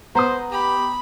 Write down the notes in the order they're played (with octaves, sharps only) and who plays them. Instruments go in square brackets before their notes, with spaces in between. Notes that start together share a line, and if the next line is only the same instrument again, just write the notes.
[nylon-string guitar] B3 [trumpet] C5 [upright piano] A#5 D#6
[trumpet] G4 [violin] B5